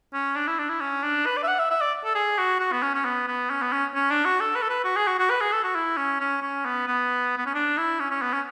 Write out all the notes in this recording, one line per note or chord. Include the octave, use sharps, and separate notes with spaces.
C#4
D4
E4
D4
E4
C#4
D4
B4
D5
E5
F#5
E5
E5
D5
A4
G#4
F#4
F#4
B3
C#4
C#4
B3
B3
C#4
B3
C#4
C#4
D4
F#4
A4
B4
A4
B4
F#4
G#4
F#4
F#4
B4
G#4
A4
F#4
E4
C#4
C#4
C#4
B3
B3
B3
C#4
D4
E4
C#4
C#4
B3
C#4